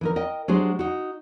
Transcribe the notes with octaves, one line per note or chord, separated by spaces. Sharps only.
E3 D#4 A#4
A#4 D#5 G5
F#3 G#3 D4 G4 C5
D#4 F#4